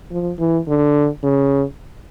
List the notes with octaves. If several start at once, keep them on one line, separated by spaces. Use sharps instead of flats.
F3
E3
D3
C#3